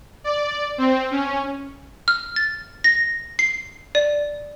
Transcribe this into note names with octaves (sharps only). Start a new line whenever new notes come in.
D5
C4
C#4
F6
A6
A#6
C7
D5